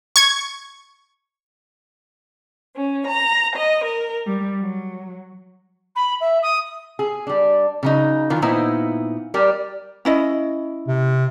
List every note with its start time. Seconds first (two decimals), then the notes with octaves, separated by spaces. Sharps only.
0.16 C#6 G#6
2.75 C#4
3.07 A#5
3.55 D#5
3.84 A#4
4.26 G3
4.59 F#3
5.95 B5
6.20 E5
6.42 D#6
6.99 G#4
7.27 G3 D4
7.83 C#3 F#3 D#4
8.30 D#3 E3 F4 A#4
8.42 A#2 A#3 B3 D#4 E4 C5
9.34 G3 G4 A#4
10.05 C#4 E4 D#5
10.88 C3